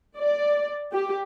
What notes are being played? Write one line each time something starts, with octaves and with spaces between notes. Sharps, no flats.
D5
G4